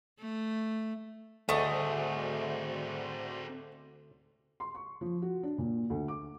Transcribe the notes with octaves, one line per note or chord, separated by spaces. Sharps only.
A3
D2 A3 C4 F#4 G#4 C5 D5 D#5
C6
C#6
F3
F#4
D4
A#2
D2
D6